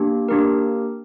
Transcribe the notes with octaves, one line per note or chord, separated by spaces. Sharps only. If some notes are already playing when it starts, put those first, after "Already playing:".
Already playing: A#3 D4 G4
A#3 D4 G4 A#4